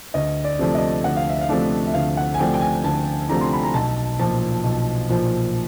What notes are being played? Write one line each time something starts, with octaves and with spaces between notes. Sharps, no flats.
D2 D#5
D5
C3 F3 A3 D4
D#5
D2 F#5
F5
E5
F5
C3 F3 A3 D4
E5
D2 F5
F#5
G#5
C3 F3 A3 D4 G5
G5
G#5
D2 A5
C3 F3 A3 D4 A#5
C6
B5
A#5
B1 A5
A#2 F3 A5
B1
A#2 F3